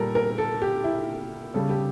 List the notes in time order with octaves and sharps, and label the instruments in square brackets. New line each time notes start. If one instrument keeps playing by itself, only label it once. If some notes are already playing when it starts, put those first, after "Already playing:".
Already playing: [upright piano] A#2 G3 A4 A#4
A#4
A4
G4
E4
C#3 G3 A4
G4